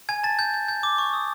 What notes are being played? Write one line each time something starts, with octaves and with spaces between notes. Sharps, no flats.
G#5 G#6
A5 A6
G6
G6
G6
D6
C#6
D#6